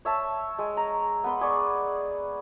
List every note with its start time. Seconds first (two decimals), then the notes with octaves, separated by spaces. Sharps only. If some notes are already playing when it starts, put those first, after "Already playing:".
0.05 C#5 E5 A5
0.58 G#3
0.77 A#5
1.24 B3 B4 C6
1.41 G#4 D5 C#6